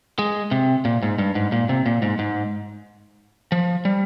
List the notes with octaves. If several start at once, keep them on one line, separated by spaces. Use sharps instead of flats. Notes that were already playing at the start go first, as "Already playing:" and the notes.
G#3
C3
A#2
G#2
G2
G#2
A#2
C3
A#2
G#2
G#2
F3
G3